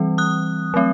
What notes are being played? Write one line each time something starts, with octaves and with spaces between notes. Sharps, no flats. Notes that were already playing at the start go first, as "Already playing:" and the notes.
Already playing: E3 G3 C4
D#6 F#6
F#3 A3 C4